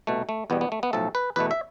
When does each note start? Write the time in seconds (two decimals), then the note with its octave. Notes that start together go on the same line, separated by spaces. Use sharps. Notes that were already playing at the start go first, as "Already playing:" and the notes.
0.07 C2 B2 A3
0.29 A3
0.50 E2 B2 G3 B3
0.61 B3
0.72 A3
0.83 B3
0.93 B1 A2 F3 A3 A4
1.15 B4
1.36 E2 B2 A3 B4
1.51 E5